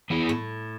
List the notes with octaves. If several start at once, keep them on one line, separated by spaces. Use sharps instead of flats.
E3 B3 E4 G#4
A2